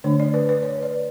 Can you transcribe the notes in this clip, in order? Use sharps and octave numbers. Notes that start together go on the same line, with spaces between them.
D3 A3 D4 C#5
D5
B4
B4
C#5
D5